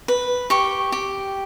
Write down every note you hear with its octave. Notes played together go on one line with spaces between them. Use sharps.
B4
G4 C#6
G4